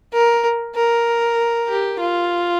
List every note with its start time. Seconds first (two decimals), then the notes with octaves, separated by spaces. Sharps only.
0.13 A#4
0.75 A#4
1.69 G4
2.00 F4